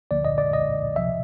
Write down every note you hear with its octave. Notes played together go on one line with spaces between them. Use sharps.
D2 D3 F3 A#3 D5
D#5
D5
D#5
C#2 C3 F3 E5